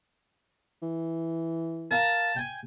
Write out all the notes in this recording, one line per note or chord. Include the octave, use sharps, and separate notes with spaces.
E3
A#4 F5 A5 A#5
G5 G#5